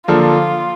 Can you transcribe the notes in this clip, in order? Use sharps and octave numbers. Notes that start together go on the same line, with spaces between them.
D3 F3 A#3 D4 F4 A4